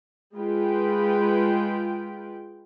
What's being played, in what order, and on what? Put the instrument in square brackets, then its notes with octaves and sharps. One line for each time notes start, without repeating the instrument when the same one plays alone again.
[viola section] G#3 F4 B4 G5